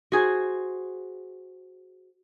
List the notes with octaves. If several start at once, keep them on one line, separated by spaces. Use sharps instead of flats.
F#4 G#4 C5